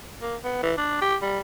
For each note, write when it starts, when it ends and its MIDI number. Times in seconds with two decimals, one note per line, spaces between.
0.21 0.35 58
0.44 0.59 59
0.63 0.73 52
0.77 0.99 62
1.01 1.16 67
1.22 1.40 55